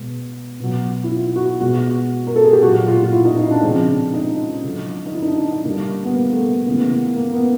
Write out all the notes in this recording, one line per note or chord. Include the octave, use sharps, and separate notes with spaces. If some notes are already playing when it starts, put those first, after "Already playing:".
Already playing: B2 G#3
B2 F#3
E4
F4
F#4
B2 G#3 F#4
A#4
A4
G#4
G4
A#2 F#3 F#4
F4
F4
E4
D#4
D#4
D4
C#3 F3 G#3 C4
D4
D#4
D3 F#3
D#4
E4
D#4
D4
D4
D#4
D3 G3 A#3
B3
A#3
A3
A#3
C#3 E3 G#3 B3
A#3
A#3
B3